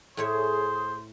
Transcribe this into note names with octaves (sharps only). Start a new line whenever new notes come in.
A2 E4 G#4 C5 C#5